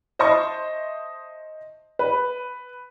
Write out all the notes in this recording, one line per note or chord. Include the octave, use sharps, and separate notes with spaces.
C5 D#5 E5 A5 C6 C#6
B4